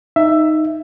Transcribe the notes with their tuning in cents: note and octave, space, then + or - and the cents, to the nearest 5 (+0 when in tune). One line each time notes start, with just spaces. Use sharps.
D#4 +0 E5 +10